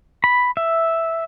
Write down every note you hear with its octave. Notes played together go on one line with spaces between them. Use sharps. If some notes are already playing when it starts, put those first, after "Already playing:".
B5
E5